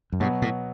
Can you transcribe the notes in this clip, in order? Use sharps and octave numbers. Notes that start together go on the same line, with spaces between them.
F#2
G2 B2 F#3 B3
A2